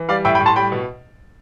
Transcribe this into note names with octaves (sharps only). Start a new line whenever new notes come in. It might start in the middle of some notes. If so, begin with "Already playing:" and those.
Already playing: E3
G3 D5 F5
A2 E5 G5
G5 B5
A2
A5 C6
G3 G5 B5
B2